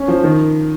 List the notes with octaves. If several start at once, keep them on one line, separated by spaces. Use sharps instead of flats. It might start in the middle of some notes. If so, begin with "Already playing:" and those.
Already playing: C#4
F3
D#3